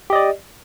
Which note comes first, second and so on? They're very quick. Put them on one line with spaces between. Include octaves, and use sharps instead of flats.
G4 D#5 D5